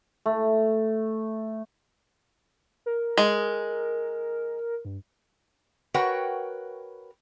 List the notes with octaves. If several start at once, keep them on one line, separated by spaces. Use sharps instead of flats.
A3
A#4
G#3
G2
F#4 A#4 B4 C#5 F#5 G5